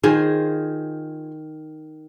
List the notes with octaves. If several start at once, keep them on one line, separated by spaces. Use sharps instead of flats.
D#3 F4 G#4 C5